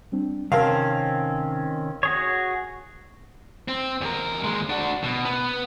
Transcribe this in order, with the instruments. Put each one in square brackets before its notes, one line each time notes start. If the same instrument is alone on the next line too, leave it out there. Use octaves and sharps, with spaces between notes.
[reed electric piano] G3 C4 D4
[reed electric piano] C3 A5 E6 [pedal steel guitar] D#3 C4 C#4 [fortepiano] A#4 F5
[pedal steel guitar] F#4 G#4 C#5 [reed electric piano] D#6
[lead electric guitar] C4
E2 A#4
D#2 G#3
D4 F#4
B2
B3